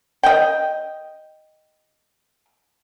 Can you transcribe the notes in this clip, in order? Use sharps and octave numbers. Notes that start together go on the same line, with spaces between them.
D#5 G5